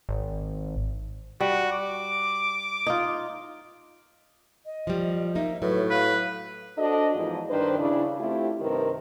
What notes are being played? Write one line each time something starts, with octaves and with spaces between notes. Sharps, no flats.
G#1
G3 F#4
D6
D#4 F4
D#5
F3 G3
A#3 D#4 E5
A2 F#3 B4
B4 F5
D4 F#4 A4 C5 D#5
E2 G#2 F3
G2 D#3 D4 B4 C5
C#3 D4 E4
A3 C4 E4 F4 G4
G2 C3 D#3 C4 A#4 B4